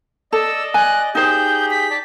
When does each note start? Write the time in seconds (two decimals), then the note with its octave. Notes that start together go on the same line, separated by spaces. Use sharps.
0.33 A4 D5 D#5 E6
0.74 G#5 F#6
1.15 D#4 G4 G#4 C5 G6
1.70 B6
1.91 D5 A5